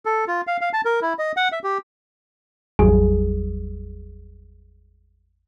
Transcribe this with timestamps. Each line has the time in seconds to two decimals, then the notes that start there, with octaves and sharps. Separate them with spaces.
0.05 A4
0.28 F4
0.47 F5
0.61 F5
0.73 A5
0.85 A#4
1.02 E4
1.19 D#5
1.37 F#5
1.52 E5
1.64 G4
2.79 G#1 E2 F#3 G3 G#4